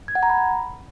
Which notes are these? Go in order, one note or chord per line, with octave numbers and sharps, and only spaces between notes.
G#6
F#5
A#5
B5